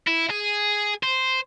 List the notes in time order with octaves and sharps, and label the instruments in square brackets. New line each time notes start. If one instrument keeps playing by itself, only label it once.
[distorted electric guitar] E4
G#4
C5